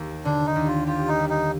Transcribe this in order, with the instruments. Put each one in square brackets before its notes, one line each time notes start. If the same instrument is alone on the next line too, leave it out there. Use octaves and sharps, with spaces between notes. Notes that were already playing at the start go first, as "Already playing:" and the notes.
Already playing: [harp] D#2 A#3
[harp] D3 [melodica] D4
[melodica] D#4
[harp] D#2
[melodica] F4
[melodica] F4 [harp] G4
[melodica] D#4
[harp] G3
[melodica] D#4